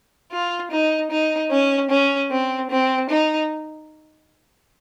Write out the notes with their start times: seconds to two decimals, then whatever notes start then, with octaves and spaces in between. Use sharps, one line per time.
0.32 F4
0.71 D#4
1.11 D#4
1.51 C#4
1.90 C#4
2.31 C4
2.70 C4
3.10 D#4